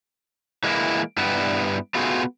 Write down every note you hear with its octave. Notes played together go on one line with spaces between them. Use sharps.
E3 G#3 A#3 D4 E4
G2 G3 B3 E4
A3 B3 F4 F#4 G#4